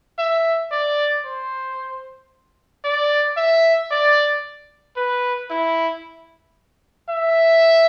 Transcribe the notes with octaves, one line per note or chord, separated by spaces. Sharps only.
E5
D5
C5
D5
E5
D5
B4
E4
E5